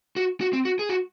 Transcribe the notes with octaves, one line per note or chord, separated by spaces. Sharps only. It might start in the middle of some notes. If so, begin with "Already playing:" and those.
F#4
F#4
C4
F#4
G#4
F#4